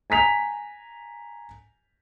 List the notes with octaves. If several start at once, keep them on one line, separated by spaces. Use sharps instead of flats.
G#5 A#5 B6 F7